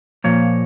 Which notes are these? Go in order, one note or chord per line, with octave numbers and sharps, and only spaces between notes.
A#2 F3 A#3 C#5